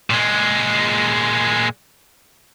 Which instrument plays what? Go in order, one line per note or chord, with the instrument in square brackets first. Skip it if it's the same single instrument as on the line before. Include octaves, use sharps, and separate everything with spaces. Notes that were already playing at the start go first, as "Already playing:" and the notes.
[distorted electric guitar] A#2 G#3